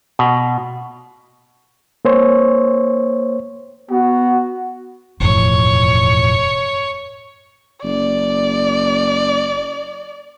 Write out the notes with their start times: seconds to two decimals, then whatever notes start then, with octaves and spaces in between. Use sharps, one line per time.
0.19 B2
2.05 A#3 C5 C#5
3.91 B3 F#4
5.20 E1 F#2 A2 F3 D#4 C#5
7.83 F#1 D5